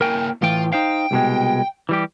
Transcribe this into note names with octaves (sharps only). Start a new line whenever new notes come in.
A#3 E4 A#4 G5 G#5
A2 E3 F4 G5
D#4 C5 F5 G5
C2 B2 G#3
E3 G3 G4